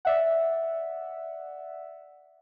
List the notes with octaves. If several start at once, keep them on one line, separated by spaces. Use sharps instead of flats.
D5 E5 F#5